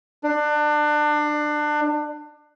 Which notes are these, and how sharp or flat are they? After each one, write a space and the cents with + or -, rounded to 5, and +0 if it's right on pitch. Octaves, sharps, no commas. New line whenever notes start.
D4 +25